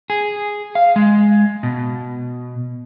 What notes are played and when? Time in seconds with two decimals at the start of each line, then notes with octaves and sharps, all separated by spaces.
0.10 G#4
0.75 F5
0.96 G#3
1.63 B2